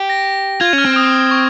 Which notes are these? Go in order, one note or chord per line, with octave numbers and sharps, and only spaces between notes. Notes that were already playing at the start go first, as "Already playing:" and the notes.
Already playing: G4
A#6
F4 G#6
C#4
F6
C4
D#6
C#6